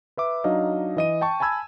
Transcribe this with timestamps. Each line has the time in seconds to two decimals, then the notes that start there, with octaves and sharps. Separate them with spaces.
0.17 B4 E5 D6
0.44 F#3 D4 D#4 D#5 F5
0.97 E3 D#5 D#7
1.21 G5 A5 C#6
1.40 G#5 A5 B5 E6 G#6